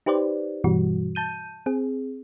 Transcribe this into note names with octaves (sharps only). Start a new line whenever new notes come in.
D#4 G4 B4 C5 D5
G2 B2 E3 G3 F#4
A5 G6 D#7
C4 G#4